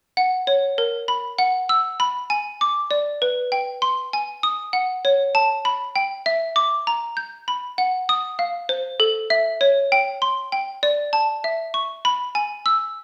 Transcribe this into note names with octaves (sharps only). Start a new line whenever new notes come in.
F#5
C#5
A#4
B5
F#5
E6
B5
G#5
D6
D5
B4
G5
C6
G#5
D#6
F#5
C#5
A5
B5
G5
E5
D6
A#5
G6
B5
F#5
D#6
F5
C5
A4
E5
C#5
G5
C6
G5
D5
A5
E5
C#6
B5
G#5
E6